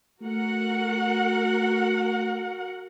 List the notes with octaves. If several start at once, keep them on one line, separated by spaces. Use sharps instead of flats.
A3 F#4 A#4 F#5